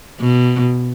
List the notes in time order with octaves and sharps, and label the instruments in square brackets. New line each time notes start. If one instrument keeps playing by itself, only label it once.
[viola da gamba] B2